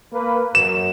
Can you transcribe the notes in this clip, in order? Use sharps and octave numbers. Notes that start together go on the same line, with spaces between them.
A#3 B4
F#2 E7